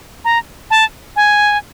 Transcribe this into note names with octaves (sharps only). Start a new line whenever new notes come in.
A#5
A5
G#5